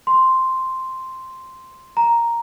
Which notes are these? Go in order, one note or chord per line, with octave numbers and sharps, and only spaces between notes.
C6
A#5